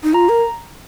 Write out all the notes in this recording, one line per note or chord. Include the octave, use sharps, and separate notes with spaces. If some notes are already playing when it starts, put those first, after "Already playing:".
D#4
F4 A#5
A#4